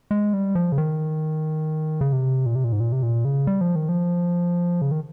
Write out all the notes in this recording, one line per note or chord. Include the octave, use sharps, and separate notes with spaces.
G#3
G3
F3
C#3
D#3
C#3
C3
A#2
C3
A#2
G#2
A#2
C3
A#2
C#3
G3
F3
D#3
F3
C#3
D#3